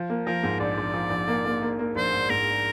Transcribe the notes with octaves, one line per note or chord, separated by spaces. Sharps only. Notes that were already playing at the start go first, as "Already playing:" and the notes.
Already playing: F3
A#3
F3 A#4
G#2
A#1 D5
A#1
F3
A#1
A#3
A#3
A#3
A#3
A#1 C5
G#2
G#2 A#4